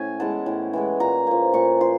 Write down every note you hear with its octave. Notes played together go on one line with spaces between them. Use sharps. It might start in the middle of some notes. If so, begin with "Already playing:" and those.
Already playing: A2 C#4 G#5
E3 G#3 B3 A5
A2
E3 G#3 B3
A#2 A#5
F3 A#3
A#2 C#6
F3 C6